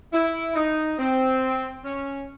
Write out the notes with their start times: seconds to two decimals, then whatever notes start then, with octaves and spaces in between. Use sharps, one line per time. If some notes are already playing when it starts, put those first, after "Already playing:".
0.13 E4
0.55 D#4
0.98 C4
1.85 C#4